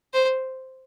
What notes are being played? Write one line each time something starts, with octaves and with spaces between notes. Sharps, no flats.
C5